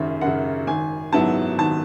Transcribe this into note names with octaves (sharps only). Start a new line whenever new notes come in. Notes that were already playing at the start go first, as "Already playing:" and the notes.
Already playing: G#1 F#2 C#3 E5
F#2 F#5
C#3
G#1 G#5
G#2 F#3 B3 E4 A5
G#1 A5